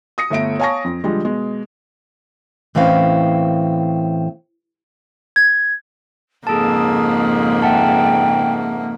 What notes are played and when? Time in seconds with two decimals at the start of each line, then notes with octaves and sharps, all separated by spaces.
0.18 D#6 A#6 C#7
0.30 G1 A3 E5 D7
0.59 C#5 F5 G#5 A5 C#6 A#6
0.84 F2
1.04 D3 F3 G3 G#3
1.25 B2 G#3
2.75 A2 E3 C4 C#4 F5
5.36 G#6
6.47 F2 G#2 C#3 A#3 G#4 A4 A5 D#6
7.62 E5 F#5 G5 A5